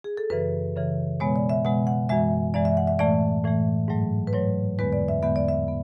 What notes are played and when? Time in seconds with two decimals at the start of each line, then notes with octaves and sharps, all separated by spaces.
0.04 G#4
0.17 A4
0.30 F#2 C#3 E3 B4
0.76 F#2 C#3 E3
1.20 B2 G#3 B3 C#5
1.36 D5
1.49 E5
1.65 B2 G#3 B3 F#5
1.87 F#5
2.09 F#2 E3 G#3 E5
2.54 F#2 E3 G#3 D5
2.65 E5
2.77 F#5
2.87 E5
2.99 A2 E3 A3 D5
3.44 A2 E3 A3
3.88 G#2 F#3 A3
4.27 B4
4.33 G#2 F#3 A3 C#5
4.79 E2 D3 G#3 B3 B4
4.93 D5
5.08 E5
5.23 E2 D3 G#3 B3 E5
5.36 D5
5.48 E5
5.68 B3